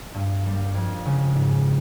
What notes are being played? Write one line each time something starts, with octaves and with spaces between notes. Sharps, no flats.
G2
G3 A#3
F2
C#3 G#3
G#2